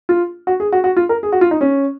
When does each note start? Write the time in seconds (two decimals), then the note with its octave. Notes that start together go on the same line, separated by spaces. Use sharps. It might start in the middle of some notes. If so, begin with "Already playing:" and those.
0.09 F4
0.47 F#4
0.60 G#4
0.72 F#4
0.84 F#4
0.97 F4
1.09 A#4
1.23 G#4
1.32 F#4
1.41 F4
1.51 D#4
1.61 C#4